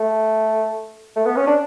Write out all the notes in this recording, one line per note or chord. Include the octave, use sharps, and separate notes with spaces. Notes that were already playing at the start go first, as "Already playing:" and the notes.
Already playing: A3
A3
B3
C#4
D4